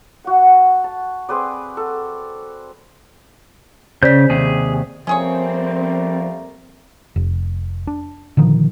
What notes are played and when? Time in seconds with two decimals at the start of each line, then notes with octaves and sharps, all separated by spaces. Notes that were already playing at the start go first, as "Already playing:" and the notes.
0.24 F#4 F#5
0.84 A5
1.29 C4 G#4 B4 D5
1.77 A4
4.03 C#3 C5 D5 G6 B6
4.30 D#2 C3 G#4
5.07 F3 G3 A3 A#3 C4 C#4 G#4 C#5
7.16 F1
7.87 D4
8.37 A#2 D3 D#3 F3